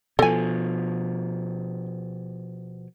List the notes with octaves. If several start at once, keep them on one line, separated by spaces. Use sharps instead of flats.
B2 F3 A4 G#5